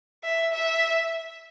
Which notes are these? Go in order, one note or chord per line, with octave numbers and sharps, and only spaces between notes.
E5
E5